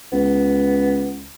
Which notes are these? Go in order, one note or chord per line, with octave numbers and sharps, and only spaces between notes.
C#2 B3